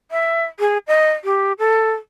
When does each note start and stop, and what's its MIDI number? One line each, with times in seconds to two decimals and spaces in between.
0.11 0.45 76
0.60 0.78 68
0.88 1.11 75
1.24 1.53 67
1.59 1.92 69